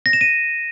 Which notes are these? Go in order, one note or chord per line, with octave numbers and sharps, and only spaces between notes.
A#6
E7
D#7